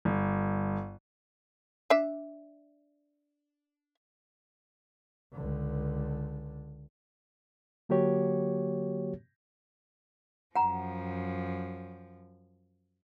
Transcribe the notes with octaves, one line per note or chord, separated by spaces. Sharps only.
G1
D4 E5
C#2 D3
D3 F#3 A#3 F#4 G4 C#5
F#2 F3 F#5 A#5